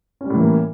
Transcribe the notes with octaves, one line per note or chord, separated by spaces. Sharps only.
A2 E3 G3 A#3 C#4